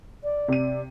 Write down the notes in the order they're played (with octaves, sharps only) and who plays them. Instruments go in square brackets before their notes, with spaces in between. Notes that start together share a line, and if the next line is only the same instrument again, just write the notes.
[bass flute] D5
[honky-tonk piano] C3 D#7